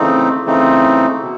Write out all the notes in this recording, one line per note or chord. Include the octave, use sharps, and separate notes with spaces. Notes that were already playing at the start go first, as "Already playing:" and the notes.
Already playing: C#3 E3 A3 C4 D#4
C#3 E3 A3 C4 D#4
B2